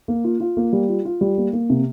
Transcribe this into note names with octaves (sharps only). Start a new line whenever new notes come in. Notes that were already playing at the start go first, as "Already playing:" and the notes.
A#3
F4
F4
A#3
G3
F4
F4
G3
A#3
A#3
C3